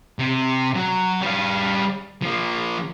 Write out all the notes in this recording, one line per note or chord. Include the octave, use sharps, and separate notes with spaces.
C3
F#3
G3 F5
F3 A#3